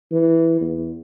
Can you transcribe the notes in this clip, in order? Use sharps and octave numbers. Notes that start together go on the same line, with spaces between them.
E3
E2